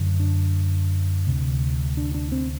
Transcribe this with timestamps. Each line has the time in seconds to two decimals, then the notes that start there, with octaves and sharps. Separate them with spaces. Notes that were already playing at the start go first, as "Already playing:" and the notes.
Already playing: F#2 D3
0.20 D4
1.27 D2 C3
1.97 D4
2.15 D4
2.32 C4